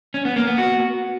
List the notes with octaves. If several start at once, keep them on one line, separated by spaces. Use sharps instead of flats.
C#4
B3
A#3
B3
F#4